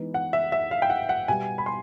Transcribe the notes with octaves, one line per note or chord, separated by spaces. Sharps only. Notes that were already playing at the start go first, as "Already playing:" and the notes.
Already playing: E3 G#3 B3 D#4
F#5
E5
E5
F5
G5
F#5
F#5
B2 G3 B3 G#5
B5
C6